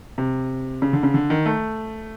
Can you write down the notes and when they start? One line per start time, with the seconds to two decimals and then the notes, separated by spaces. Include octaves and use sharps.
0.18 C3
0.82 C#3
0.93 D3
1.03 C#3
1.14 D3
1.30 D#3
1.46 A3